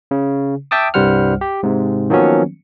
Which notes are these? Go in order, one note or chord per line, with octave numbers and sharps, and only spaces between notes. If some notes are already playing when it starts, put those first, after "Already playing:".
C#3
E5 G5 A5 D6 D#6
C2 G2 G3 C5 F#5 F6
G4
G#2 C3
D#3 F3 F#3 A#3 B3 C#4